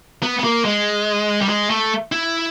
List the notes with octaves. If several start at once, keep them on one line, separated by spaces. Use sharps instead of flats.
B3
B3
A#3
G#3
G3
G#3
A3
E4